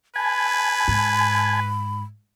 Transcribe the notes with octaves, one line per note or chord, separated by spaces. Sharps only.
B4 G#5 A5 B5 G#6
G#2